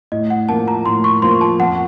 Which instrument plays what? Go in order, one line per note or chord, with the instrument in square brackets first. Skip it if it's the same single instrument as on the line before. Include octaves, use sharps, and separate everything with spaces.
[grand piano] A2 [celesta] D#5
[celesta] F#5
[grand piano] F3 A#3 [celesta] A5
[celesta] A#5
[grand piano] A2 [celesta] C6
[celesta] C#6
[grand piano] F3 A#3 [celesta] C6
[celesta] A5
[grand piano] F2 [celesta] F#5